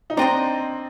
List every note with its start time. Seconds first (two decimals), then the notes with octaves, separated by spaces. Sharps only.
0.10 D#4
0.17 C4 D4 C5 D#5 G5 A#5